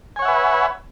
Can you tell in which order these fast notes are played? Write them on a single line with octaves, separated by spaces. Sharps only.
G#5 C#5 F#5 E5 B4